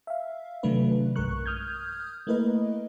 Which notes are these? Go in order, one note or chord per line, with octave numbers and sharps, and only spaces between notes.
E5 F5
C3 D#3 F#3 A3 D4 B4
B1 G2 G#3 A#4 C#6 F#6
D#6 F6 G6 G#6
A3 A#3 E4 A#4 B4 D#5